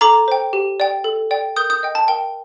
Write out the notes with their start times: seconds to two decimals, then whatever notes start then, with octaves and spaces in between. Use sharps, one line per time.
0.01 A4 A#5 D6
0.28 C5 G5
0.53 G4
0.80 D5 G5
1.04 A4
1.31 D5 G5
1.56 A#4 D#6 G6
1.70 D#6 G6
1.83 D#5 G5
1.95 A5
2.08 A#4 G5